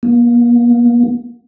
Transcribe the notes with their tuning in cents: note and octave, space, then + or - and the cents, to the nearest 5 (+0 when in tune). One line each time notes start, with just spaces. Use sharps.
A#3 +40